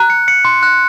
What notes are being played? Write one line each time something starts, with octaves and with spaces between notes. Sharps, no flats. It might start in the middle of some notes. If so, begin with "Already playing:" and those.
Already playing: A#5 F#6
C#7
C#7
C6
F#6